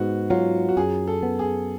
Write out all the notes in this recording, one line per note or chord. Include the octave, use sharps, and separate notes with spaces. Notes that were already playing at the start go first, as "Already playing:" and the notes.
Already playing: G#2 B3 F#4
F#3 F4
F#4
F#2 G#4
A4
B3
G#4